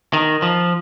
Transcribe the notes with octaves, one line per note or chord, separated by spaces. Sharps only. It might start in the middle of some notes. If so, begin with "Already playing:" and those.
D#3
F3